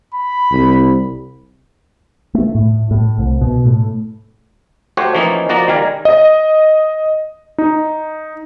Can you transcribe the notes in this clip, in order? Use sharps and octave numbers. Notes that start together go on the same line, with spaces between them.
B5
C2
A3
A2
A2
C2
B2
A2
A3 F#4 G4 C5 C#5
E3 F3 A#3 C#4 D#4
F3 A#3 D#4 F#4 D5 A#5
D#3 G3 A#4 G#5
D#5
D#4